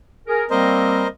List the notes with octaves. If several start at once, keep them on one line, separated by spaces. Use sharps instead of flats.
G#4 A#4
G3 A#3 C4 A#4 C5 D#5